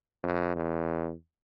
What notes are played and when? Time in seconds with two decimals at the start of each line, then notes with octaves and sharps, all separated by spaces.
0.23 F2
0.56 E2